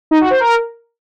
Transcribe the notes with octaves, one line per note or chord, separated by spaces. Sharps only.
D#4
F#4
C5
A#4